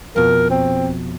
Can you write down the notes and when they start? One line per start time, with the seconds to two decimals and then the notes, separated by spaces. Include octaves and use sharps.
0.16 F2 B2 A#4
0.50 C4